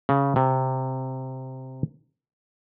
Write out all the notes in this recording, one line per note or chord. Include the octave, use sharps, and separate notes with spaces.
C#3
C3